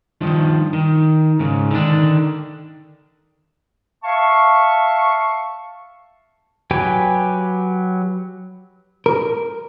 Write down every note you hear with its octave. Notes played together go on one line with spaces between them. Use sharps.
G2 D#3 F3
D#3
G#2 C#3
D3 D#3 D4
E5 F5 A5 C#6
F#3 G4 B4 G5 G#5
A#4